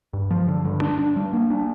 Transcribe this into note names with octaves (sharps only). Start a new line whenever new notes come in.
G2
F3
D3
G2
D4
D4
G3
A#3
D4